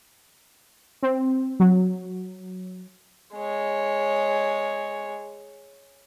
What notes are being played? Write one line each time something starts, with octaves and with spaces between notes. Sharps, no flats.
C4
F#3
G#3 C#5